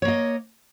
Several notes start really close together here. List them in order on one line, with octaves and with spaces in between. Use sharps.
C#5 A#3 D#5